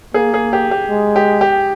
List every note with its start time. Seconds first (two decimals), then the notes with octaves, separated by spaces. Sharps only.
0.14 A#3 G#4
0.34 G#4
0.53 G4
0.71 G4
0.90 G#3
1.16 G4
1.41 G4